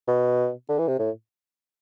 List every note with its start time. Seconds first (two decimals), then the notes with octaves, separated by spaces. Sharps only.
0.08 B2
0.69 D3
0.79 E3
0.88 C3
0.99 A2